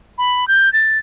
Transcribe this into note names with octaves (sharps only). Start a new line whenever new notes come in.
B5
G6
A6